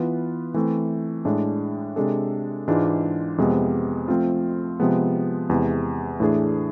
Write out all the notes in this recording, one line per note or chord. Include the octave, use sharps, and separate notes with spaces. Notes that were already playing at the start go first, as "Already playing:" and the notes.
Already playing: E3 B3 F4 B4
E3 A3 C4
A2 G#3 D4
C3 G#3 D4 A4
G#2 E3 G#3 D4 F4
F2 C3 G#3 B3
F3 A3 C4 F4
C3 F3 G#3 B3
E2 C3 G#3
A2 E3 A3 D4 G#4